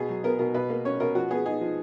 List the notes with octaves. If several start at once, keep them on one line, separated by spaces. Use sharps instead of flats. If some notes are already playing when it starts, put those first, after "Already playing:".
Already playing: B2 G#4
F#3
B3 A#4
B2 A#4
B2 B4
A#3
C#4 C#5
B2 A#4
F3 F#4
B3 G#4
D#4 G#4
F3